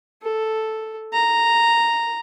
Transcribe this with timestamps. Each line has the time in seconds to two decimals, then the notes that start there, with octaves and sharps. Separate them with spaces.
0.23 A4
1.13 A#5